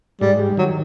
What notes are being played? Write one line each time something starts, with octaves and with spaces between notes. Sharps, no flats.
G#2 G3
G3
D#3 F#3